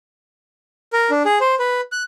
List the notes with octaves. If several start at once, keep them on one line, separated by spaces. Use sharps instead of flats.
A#4
D4
G#4
C5
B4
F#6